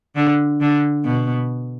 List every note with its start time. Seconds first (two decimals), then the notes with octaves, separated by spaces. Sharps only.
0.16 D3
0.61 D3
1.05 B2